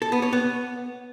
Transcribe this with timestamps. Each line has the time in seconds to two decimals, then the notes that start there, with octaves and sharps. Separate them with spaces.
0.02 A4
0.12 B3
0.22 C#5
0.33 B3